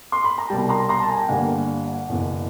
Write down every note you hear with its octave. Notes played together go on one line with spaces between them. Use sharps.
C6
B5
A#5
C2 B2 G3 G5 A5
A#5 C6
A#5 C6
A5
G#5 A#5
G5
G1 G2 D3 G3 A#3 F#5 G#5
F#1 E2 B2